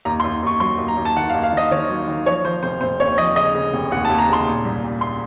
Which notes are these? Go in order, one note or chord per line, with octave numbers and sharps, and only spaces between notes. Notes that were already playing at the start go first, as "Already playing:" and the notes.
D#2 A#5
C6
D#2
D#2 C#6
F#3 C6
D#2
A#5
D#2
A5
D#3 F#5
F5
D#2
F5
D#3
D#5
D#3 C#5
F#3
D#3
F3 C#5
F3 C5
F1 C5
F1 C5
D#2 C#5
F3 D#5
C#3 D#5
C#3
F1
D#2 F#5
A5
D#2
A#5
C#3 C6
A#2
C2
A#2
C6